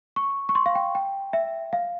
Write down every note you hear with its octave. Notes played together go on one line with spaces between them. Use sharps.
C#6
C#6
C6
F5
G5
G5
E5
F5